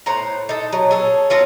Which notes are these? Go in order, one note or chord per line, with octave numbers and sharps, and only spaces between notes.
A2 C5 F#5 A#5
D#4 A4
F#3
G#4 A4 C#5
C#4 F4 F#4 A4